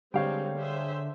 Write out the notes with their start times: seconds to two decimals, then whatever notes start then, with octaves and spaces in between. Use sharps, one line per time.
0.14 D3 G3 G#3 C4 C#5 F5 G5
0.59 G#4 C5 E5